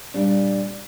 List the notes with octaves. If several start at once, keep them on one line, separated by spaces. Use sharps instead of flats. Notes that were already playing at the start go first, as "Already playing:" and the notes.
A#2 G3 D4